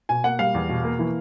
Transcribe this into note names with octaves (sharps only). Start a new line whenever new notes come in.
B2 G#5
A#3 F#5
G3 F5
E2
B2
A#3
E3